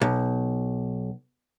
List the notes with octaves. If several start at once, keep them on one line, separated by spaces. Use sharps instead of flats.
B1